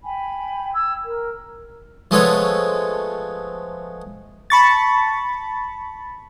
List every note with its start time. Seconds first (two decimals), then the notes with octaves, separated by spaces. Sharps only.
0.03 G5 G#5 B5
0.71 E6 G#6
1.03 A#4
2.11 F3 G#3 A3 B3 A4 C#5
4.50 A5 B5 C#6 A6